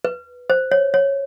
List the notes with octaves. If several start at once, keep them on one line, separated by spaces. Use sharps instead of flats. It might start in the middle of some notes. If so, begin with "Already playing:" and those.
B4
C5
C#5
C#5